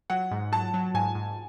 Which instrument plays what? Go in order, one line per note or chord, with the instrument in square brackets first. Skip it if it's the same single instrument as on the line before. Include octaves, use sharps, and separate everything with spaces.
[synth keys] F#3 [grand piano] F#5
[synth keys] G#2
[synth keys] F#3 [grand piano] A5
[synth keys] F#3
[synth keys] G#2 [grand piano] G#5
[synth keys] G#2